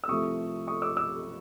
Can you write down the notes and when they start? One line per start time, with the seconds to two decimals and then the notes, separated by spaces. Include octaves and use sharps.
0.04 E6
0.08 C2 C3 F3 A3 C#6 D#6
0.67 C#6 D#6
0.82 D6 E6
0.97 D6 E6